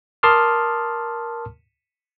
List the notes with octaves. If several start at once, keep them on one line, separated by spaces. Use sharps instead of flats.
A#4 A5 C6 D6 D#6 F6